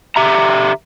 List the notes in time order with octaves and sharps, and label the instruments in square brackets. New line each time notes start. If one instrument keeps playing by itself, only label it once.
[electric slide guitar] D3 G4 E5 A#5